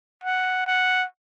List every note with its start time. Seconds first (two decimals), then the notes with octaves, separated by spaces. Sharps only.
0.24 F#5
0.67 F#5